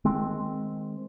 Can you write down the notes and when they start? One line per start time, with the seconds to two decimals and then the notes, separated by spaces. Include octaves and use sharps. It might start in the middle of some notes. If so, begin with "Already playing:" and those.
0.05 D#3 G#3 C4